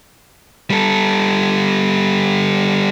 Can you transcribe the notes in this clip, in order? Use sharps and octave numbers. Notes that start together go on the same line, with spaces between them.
G3 A4